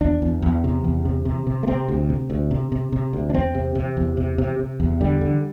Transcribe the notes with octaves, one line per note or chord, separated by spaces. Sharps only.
E2 D4
E2
E2
C3
E2
C3
C3
C3
A3
C3 C4
D2
C3
D2
C3
C3
C3
D2
D4
E2 C4
C3
C3
E2
C3
C3
C3
E2
D3 G3
D3